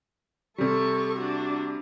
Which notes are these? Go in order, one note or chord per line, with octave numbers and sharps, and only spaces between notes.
C3 G3 A4 C#6
D4 F#4